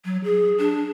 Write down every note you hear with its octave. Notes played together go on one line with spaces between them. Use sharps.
F#3
G#4
D4